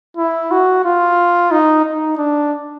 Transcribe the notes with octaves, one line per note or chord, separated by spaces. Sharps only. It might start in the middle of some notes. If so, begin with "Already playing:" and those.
E4
F#4
F4
D#4
D#4
D4